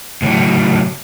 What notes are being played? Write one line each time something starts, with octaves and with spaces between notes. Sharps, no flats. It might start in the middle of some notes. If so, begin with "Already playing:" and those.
A2 C#3 F#3